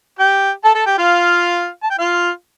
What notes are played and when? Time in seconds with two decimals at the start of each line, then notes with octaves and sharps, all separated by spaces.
0.19 G4 G5
0.64 A4 A5
0.75 A4 A5
0.86 G4 G5
0.98 F4 F5
1.83 A5
1.90 G5
1.99 F4 F5